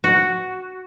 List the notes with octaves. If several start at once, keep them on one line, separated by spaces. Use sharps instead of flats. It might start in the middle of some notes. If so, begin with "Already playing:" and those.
F#4